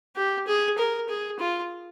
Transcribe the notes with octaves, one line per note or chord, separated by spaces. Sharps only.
G4
G#4
A#4
G#4
F4